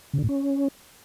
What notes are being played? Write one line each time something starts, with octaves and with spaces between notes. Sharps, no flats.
C#3
D3
A2
C#4